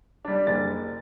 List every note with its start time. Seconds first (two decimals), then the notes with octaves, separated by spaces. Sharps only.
0.25 G3 D4
0.47 F#1 A6